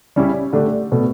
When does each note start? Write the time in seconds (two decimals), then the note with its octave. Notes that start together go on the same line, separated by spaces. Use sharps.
0.16 C#3 G3 C#4 E4 G4
0.53 D3 A3 D4 G4
0.92 B2 A3